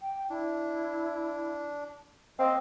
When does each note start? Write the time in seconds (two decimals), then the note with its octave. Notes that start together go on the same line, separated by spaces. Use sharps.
0.01 G5
0.30 D4 E4
2.39 A#3 C4 D#5 F5